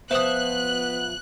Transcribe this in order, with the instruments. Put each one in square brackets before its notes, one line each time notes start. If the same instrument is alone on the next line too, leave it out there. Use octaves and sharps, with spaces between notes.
[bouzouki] F3 E5 [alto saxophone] B3 [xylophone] C5 D#6 [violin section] F#6